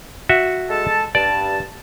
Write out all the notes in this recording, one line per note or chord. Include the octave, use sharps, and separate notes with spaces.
F#4 E5
G#3 A4 A5
G2 D5 A5